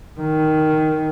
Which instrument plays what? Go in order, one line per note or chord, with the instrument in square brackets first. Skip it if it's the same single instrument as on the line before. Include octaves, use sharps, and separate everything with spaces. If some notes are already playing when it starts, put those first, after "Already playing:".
[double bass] D#3